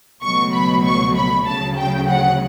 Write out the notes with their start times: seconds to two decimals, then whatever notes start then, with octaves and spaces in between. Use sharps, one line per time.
0.23 C#2 B2 F#3 A3 C#6
0.53 B5
0.85 C#6
1.15 B5
1.47 D2 C#3 F#3 A5
1.78 G5
2.08 F#5